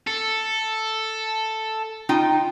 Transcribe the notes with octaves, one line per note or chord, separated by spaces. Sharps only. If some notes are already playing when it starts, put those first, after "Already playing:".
A4
D#4 F4 G5